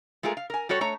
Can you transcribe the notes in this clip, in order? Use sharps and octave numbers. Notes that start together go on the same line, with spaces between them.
G#3 A3 F4 G#4 A#4
F5
A#4 G#5
G3 F#4 A4 C#5
A3 C#5 A#5